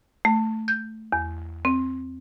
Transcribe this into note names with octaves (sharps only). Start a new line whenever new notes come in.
A3
G6
E2
C4